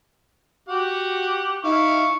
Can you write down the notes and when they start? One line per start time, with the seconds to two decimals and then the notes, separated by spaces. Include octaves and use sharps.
0.69 F#4 G4 F#5
1.64 D#4 E4 F5 C#6